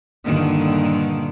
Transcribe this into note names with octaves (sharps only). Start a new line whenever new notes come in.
G2 A#2 D3 D#3